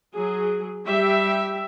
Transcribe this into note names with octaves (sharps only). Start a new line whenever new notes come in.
F#3 G#4
G3 G4 E5